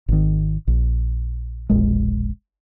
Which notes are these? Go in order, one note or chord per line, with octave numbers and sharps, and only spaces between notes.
G#1 D#3
A#1
E1 A#1 G#3